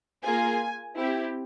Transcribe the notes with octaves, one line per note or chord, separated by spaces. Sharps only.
A#3 F4 G#4 G#5
C4 E4 G4